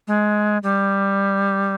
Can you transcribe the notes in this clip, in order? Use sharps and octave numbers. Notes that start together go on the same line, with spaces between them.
G#3
G3